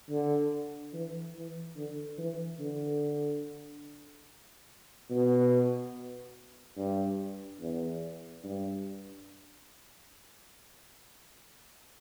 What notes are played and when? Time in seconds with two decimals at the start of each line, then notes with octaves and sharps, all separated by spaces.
0.10 D3
0.93 E3
1.35 E3
1.77 D3
2.18 E3
2.60 D3
5.10 B2
6.77 G2
7.60 E2
8.44 G2